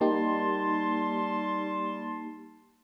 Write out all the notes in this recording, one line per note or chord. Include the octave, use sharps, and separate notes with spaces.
G3 A#3 D#4 G4 A5 C6